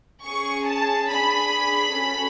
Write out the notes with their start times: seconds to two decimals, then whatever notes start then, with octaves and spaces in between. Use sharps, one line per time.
0.24 C#4 G#4 C#6
0.66 A5
1.08 D4 G#4 B5
1.92 C#4 F#4 A4